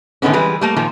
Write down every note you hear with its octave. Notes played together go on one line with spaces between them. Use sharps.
A2 D3 D#3 B3 C#4
E3 G3 G#3 B4
G3 A3 A#3
A#2 D#3 F3